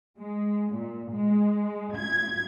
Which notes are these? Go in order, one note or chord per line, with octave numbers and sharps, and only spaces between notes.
G#3
A#2
G#3
G#6